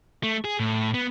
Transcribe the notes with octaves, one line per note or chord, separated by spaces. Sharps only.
A3
G#4
A2
B3